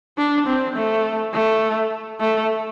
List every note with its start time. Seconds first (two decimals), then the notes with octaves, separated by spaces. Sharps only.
0.18 D4
0.47 C4
0.76 A3
1.34 A3
2.20 A3